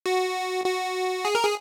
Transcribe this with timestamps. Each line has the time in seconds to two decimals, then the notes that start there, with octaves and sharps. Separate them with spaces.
0.06 F#4
0.65 F#4
1.25 G#4
1.35 A#4
1.44 G#4